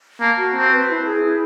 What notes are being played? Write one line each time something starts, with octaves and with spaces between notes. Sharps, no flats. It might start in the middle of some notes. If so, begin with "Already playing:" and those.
A#3 A5
F#4
C4 A5
B4
E4
G#4
E4